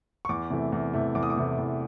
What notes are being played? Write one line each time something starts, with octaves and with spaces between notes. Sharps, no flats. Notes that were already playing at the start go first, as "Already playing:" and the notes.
C#6
E2 D6
C3 E3 A3
E2
C3 E3 A3
E2 D6
D#6
D6
C3 E3 A3
E2